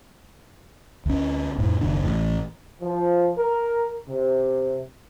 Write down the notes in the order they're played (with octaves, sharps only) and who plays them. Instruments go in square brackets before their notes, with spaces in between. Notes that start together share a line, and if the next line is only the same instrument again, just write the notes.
[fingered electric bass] D2 C#4
F2 A2
F#1 D#2 D4
A1
[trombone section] F3
A#4
C3